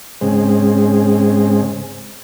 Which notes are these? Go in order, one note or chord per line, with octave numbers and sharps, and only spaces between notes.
G#2 C#3 G#3 C4